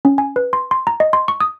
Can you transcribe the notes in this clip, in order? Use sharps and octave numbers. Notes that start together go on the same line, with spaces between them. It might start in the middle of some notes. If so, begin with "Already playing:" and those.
C#4
G#5
B4
C6
C6
A#5
D#5
C6
C#6
D#6